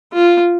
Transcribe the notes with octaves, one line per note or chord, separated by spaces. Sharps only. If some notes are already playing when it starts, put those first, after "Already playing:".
F4